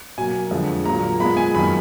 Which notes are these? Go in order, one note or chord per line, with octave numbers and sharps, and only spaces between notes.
B2 F#3 A#3 G#5
F2 D3 G#3
A#2 F#3 A#3 A#5
A#2 G#3 B3 B5
G#5
F#2 D#3 A#3 D#4 B5